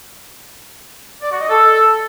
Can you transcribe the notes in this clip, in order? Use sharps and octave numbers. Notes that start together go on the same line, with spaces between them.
D5
F#4
D#5
A4